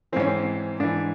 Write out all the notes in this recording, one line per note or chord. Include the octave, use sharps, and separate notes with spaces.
G#2 E3 C4 C#4
C4
G#2 E3 D4